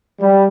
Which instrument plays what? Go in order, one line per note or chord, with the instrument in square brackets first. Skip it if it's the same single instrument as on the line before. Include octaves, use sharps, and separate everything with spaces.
[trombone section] G3